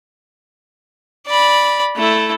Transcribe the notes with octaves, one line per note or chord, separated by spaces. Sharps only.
D5 B5
A3 E4